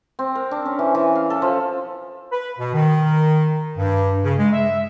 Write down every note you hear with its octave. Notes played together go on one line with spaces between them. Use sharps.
C4
A#4
D4
C#4
E3
E3
F5
A4
F3
B4
B2
D#3
G2
C#3
G#3
E5